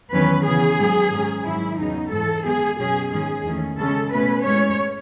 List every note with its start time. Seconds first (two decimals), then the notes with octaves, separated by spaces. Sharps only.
0.12 E2 D#3 F#3 C#4 B4
0.45 C#3 E3 B3 G#4
0.78 G#2 D#3 F#3 B3
1.12 G#2 F#3 C#4
1.45 G#2 D#3 F#3 E4
1.78 E2 C#3 F#3 B3 D#4
2.12 G#2 E3 G#3 A4
2.45 F#2 D#3 G#3 B3 G#4
2.79 B2 F#3 C#4 G#4
3.12 G#2 D#3 G#3 C#4 G#4
3.45 E2 D#3 A3 C#4
3.78 C#3 G#3 C#4 A4
4.12 B2 A3 C#4 B4
4.45 A2 G#3 C#4 C#5